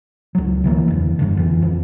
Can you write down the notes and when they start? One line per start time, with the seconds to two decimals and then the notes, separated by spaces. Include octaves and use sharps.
0.35 C#2 F#3
0.64 D3 E3 A#3
0.88 F#1 E2
1.19 F#1 G2 D3
1.37 F2 E3
1.62 F2